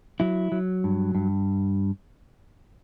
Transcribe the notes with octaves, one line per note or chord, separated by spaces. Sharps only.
F#3 E4
F#3
G2
G2